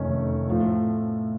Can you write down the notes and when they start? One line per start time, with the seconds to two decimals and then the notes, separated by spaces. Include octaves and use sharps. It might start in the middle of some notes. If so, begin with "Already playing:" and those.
Already playing: F1 F2 D#3 A3 C#4
0.47 A2 F3 A3